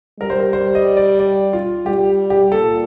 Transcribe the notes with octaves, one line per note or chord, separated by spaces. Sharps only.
G3 A#4
C5
A#4
C5
D#5
D5
D5
F4
G3 G4
G4
A#2 A4